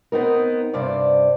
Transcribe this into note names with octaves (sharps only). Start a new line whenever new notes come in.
B3 C4 D#4 A#4
G2 C3 C5 D5